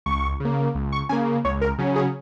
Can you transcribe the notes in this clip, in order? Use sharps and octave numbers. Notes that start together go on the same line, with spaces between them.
C#2 C#6
C#3 A#3
C#2
C#6
C#3 A#3 G#5
C#2 C#5
A#4
C#3 F#3 C#4
G#4